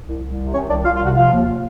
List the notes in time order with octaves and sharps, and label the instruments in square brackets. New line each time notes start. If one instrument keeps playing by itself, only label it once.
[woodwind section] C2
C2
C3
D#3 C#4 C#5
C2 D4 D5
C2 F4 F5
F4 F5
C3
F#4 F#5
F3 F4 F5
D#2